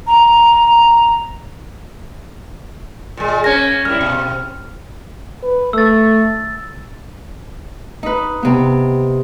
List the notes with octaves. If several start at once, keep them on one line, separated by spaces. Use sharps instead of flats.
A#5
A#2 G#3
A#3 C#4 C#5 G#6 A#6
G3 A#3 E4 F6
B2
B4
A3 E6 A6
D#4 B4
C3 B3